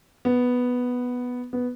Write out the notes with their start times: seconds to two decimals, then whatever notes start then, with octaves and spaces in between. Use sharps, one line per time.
0.25 B3
1.53 B3